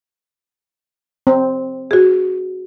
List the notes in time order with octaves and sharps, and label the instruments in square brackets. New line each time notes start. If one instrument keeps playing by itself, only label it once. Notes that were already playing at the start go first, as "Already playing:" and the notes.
[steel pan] C4
[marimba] F#4 G#4